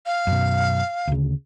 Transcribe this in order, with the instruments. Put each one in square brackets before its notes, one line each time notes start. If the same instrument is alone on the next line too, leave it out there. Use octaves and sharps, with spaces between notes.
[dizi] F5
[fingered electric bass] F#2 B2
D2 C#3